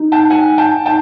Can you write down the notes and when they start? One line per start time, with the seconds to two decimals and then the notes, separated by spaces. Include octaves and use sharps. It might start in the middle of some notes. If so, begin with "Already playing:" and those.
Already playing: D#4
0.12 G5 A5
0.30 F#5 G#5
0.58 G5 A5
0.85 D#4 G5 A5